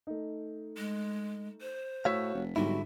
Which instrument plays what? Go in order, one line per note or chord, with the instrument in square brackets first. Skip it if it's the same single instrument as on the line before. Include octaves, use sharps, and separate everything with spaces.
[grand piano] A3 D#4
[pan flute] G#3
C5
[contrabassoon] A2 [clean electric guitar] F#4 C#5 F5 [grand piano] C#6 E6 B6
[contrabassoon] F1
[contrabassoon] B1 [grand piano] G#2 G3 [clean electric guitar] D3 E4 [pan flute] F#4